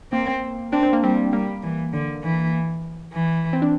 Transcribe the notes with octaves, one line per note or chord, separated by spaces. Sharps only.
A#3 C4
C4 D4
C4
A#3
G3 C4
G3 A#3
E3
D3
E3
E3
C4
D4